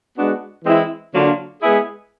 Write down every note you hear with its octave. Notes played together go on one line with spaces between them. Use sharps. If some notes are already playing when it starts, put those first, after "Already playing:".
G#3 B3 D4 F#4
E3 G#3 C4 E4
D3 F#3 A#3 D4 F4
G#3 B3 E4 G#4